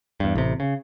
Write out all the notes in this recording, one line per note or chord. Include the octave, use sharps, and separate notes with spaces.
E2 G2
A1 C3
C#3